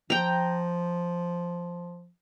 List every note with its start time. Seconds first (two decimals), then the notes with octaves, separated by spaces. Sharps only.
0.10 F3 G5 A#5